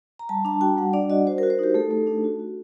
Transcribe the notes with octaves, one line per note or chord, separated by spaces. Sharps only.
A#5
G3 A5
D4 A5
F#4 G5
G3 F#5
D4 D5
F#4 D#5
F#4 C5
A#4
F#4
C5
D#4 G4
A3 A4
A3
D4
F#4
F#4